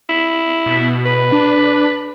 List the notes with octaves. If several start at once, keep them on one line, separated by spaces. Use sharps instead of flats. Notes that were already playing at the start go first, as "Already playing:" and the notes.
E4
B2
B4
D4